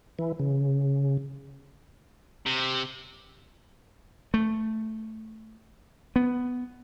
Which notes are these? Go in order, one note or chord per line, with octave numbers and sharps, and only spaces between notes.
E3
C#3
C3
A3
B3